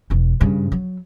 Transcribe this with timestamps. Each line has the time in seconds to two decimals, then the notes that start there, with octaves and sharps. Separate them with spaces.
0.10 E1 E3
0.41 G2 C#3
0.72 F#3